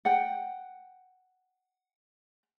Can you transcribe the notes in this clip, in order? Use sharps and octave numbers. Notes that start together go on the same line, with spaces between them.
F#5 G5